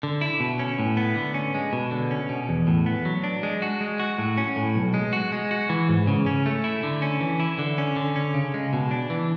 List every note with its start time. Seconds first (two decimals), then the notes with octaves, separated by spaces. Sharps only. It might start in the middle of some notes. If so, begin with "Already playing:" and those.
0.03 D3
0.21 E4
0.40 B2
0.59 C#4
0.79 A2
0.97 B3
1.16 D3
1.34 C#4
1.54 G#3
1.73 B2
1.91 D3
2.11 C#4
2.29 B2
2.49 E2
2.67 A2
2.86 B3
3.05 F#3
3.24 D4
3.43 G#3
3.62 F#4
3.81 G#3
4.00 F#4
4.18 A2
4.38 C#4
4.56 A2
4.75 B1
4.94 G#3
5.13 F#4
5.32 G#3
5.51 F#4
5.69 E3
5.89 G#2
6.07 C#3
6.26 C#4
6.46 A3
6.64 E4
6.83 D3
7.02 C#4
7.20 E3
7.40 E4
7.59 D3
7.78 C#4
7.96 D3
8.16 C#4
8.34 C#3
8.54 G#3
8.73 B2
8.91 D4
9.10 E3